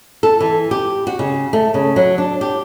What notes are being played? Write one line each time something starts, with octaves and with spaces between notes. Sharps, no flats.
A4
E3
G4
F#4
C#3
A3
C#3
F#3
D4
G4